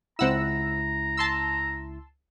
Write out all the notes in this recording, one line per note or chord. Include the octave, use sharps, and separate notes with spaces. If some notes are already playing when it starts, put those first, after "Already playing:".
C#2 C4 E4 F#5 A#5 E6
A5 C6 E6